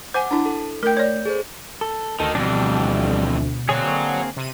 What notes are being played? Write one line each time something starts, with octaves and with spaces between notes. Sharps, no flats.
C5 F#5 G#5 D6
D4 E4 A5
A4
A3 A#4 G5 G6
C#5 D5 G6
G#4 A4 C5
A4
D2 D#3 A4
F2 B2 E3 G3 D4
D3 A#3 C4 G#4 C#5 F#5
C3 D#7